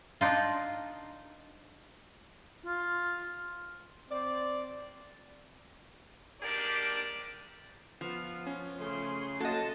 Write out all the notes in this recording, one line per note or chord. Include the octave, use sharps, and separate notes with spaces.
D4 D#4 F4
F4
C4 C5 D5
G#2 A#3 D4 G4 A#4 D5
F3 B3 F4
C#4
C#3 A3 G#4 C6
F#3 A#3 F#4 A4 D#5 A5